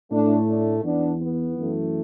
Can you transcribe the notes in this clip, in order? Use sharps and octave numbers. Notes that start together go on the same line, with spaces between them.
A2 A3 D4
D4
E2 E3 B3 D4
B3
F#2 E3 A3